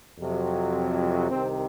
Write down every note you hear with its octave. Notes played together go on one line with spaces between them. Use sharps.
F2 C3 F#3
C2 C3 D#3 C4